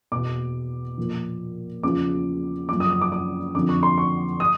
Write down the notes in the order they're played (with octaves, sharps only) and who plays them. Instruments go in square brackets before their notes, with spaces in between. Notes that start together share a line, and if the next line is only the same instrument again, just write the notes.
[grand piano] E2 B2 D6
A#2 F3
E2 C#3 F3 D6
F#2 C#3 F3 D6
D#6
D#6
D6
D6
F2 D3 F3 D6
C#6
C6
C#6
D#6